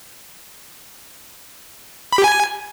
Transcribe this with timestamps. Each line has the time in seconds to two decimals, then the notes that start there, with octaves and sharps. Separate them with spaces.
2.13 B5
2.18 G4
2.24 G#5